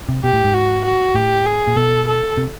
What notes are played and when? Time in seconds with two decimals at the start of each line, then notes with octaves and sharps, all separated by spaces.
0.09 C3
0.24 B2 G4
0.33 A2
0.44 G#2
0.54 F#4
0.85 F#4
1.15 A2 G4
1.46 G#4
1.67 A#2
1.76 B2 A4
2.07 A4
2.37 C3